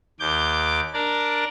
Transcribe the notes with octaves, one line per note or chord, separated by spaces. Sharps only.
D#2 D6 G6
D4 A#4 D5